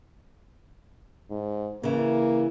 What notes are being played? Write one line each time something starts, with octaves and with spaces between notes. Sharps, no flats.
G#2
C#3 E3 A#3